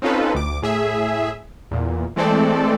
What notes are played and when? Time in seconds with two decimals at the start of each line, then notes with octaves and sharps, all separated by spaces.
0.02 C4 C#4 D#4 F4 A4 B4
0.35 D2 D6
0.62 A2 G#4 E5
1.71 E2 A#2
2.16 E3 G#3 A3 C4 A4 D5